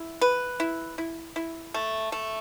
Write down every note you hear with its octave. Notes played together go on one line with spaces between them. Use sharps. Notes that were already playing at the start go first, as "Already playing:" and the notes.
Already playing: E4
B4
E4
E4
E4
A3
A3